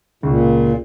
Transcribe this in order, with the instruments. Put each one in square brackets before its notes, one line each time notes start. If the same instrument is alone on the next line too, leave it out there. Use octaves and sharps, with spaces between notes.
[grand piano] C#2 [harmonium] A#2